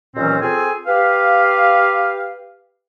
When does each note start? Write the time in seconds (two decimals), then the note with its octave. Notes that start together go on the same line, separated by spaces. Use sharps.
0.16 D#2 A#2 E3 F#3 C4 C#4
0.42 C4 F4 G#4 A4 G#5
0.87 G4 B4 F5